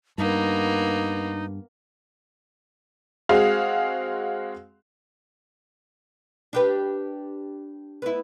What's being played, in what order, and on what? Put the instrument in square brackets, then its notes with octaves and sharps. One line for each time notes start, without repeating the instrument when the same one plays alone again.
[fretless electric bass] G2 [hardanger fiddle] A#3 B3 [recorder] D#4
[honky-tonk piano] G#3 C4 F#4 G#4 F5
[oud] D4 G4 B4
B3 E4